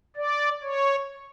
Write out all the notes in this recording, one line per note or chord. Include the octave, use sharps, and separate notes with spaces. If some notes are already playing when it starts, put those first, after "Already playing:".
D5
C#5